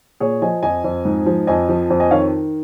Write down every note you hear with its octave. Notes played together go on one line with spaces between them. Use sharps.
A#2 G#4 C#5
F3 D#5 G#5
F2 D#5 G#5
F2
G#2
F3
F2 D#5 G#5
F3
F2
D#5 G#5
D#3 C#5 F5